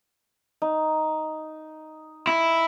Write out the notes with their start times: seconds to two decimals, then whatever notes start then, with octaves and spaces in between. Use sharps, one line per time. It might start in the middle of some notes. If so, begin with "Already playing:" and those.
0.62 D#4
2.27 E4